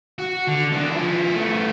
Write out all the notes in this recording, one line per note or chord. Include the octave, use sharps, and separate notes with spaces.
F#4
D3
E3 D4
F3 E4
A3 B3